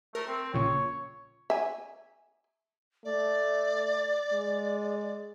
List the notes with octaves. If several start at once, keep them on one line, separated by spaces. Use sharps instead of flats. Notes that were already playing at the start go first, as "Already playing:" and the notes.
A3 A#4
C4
A#1 A#2 C#3 C#5
E5 G#5
A3 D5
G#3